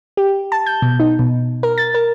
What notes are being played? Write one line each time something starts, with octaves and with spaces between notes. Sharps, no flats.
G4
A5
G6
B2
D#4
B2
A#4
A6
A#4